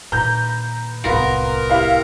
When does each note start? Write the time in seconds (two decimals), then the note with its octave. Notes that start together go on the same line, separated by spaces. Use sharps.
0.12 A#2 D#3 B4 A#5 G6
1.05 D1 C2 B3 F4 A#4
1.70 E4 G4 E5 F5 G5 F6